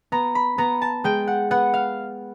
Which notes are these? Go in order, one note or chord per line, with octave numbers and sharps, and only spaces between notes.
B3 A#5
B5
B3 A#5
A5
G#3 G5
F#5
B3 F#5
F5